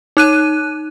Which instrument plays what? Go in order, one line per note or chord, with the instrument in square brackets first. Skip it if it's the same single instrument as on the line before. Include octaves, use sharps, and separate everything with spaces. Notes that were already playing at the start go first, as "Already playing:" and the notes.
[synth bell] D#4 F#6 D#7